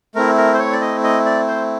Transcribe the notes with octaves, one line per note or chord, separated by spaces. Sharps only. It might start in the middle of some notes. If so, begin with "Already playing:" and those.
A3 C4 E4 A#4
A#4
C5
C#5
D5
D#5
D#5
D5
C5